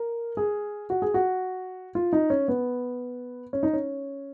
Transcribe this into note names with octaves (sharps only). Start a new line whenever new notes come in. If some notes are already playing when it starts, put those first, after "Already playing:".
Already playing: A#4
G#4
F#4
G#4
F#4
F4
D#4
C#4
B3
C#4
D#4
C#4